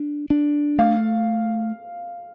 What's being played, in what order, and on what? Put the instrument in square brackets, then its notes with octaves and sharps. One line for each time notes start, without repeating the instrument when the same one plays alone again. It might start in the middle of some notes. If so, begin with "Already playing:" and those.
Already playing: [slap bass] D4
D4
[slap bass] A3 [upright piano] F5